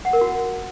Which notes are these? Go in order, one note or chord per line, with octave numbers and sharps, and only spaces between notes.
F#5
A#4
F#4